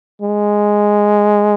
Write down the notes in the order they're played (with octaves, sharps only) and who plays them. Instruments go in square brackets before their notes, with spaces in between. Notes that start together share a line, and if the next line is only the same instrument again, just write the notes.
[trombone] G#3